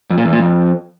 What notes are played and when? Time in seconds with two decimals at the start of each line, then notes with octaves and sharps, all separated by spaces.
0.10 F2
0.18 A#2
0.25 E2
0.32 A#2
0.39 F2